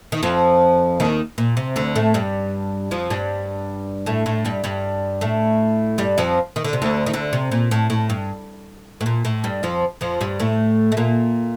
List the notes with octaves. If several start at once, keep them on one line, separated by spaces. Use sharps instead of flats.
D#3
F2 F3
D#2 D#3
A#2
C3
D2 D3
A2 A3
G2 G3
F2 F3
G2 G3
A2 A3
A2 A3
G2 G3
G2 G3
A2 A3
G2 G3
F2 F3
D#3
D3
C3
D2 D3
D#3
D2 D3
C3
A#2
A2
A2
G2
A2
A#2
A2
G2 G3
F2 F3
F2 F3
G2 G3
A2 A3
A3
A#2 A#3